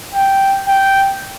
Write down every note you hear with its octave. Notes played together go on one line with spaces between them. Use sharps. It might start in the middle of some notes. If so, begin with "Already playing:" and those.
G5
G5